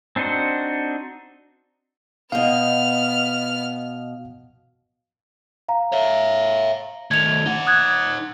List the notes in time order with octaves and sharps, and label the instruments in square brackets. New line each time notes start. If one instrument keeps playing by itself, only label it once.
[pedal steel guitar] C4 D4 D#4 F#4 C5
[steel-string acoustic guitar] B2 D#4 [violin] B3 F6 [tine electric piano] F5
[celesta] F5 A#5
[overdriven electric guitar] C#5 E5
[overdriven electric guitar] D#3 A3 [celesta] G#6 F7
[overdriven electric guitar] D#4 F#5
[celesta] D#6 F#6 G#6